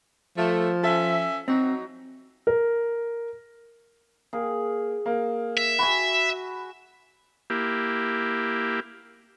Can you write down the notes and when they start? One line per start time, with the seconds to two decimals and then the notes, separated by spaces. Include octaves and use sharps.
0.37 F3 A3
0.84 C#4 A4 E5
1.48 F#3 C4 D#4 F#4
2.47 A#4
4.33 A#3 G#4
5.06 A#3
5.58 E5
5.79 F#4 G#5 B5
7.50 A#3 E4 G4